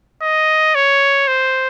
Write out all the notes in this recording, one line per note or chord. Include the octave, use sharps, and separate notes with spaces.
D#5
C#5
C5